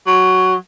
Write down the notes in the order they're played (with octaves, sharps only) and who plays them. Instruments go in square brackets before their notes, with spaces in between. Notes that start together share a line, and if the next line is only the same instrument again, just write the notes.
[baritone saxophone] F#3